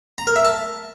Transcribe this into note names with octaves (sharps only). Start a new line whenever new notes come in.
A#5
A#4
E5
A5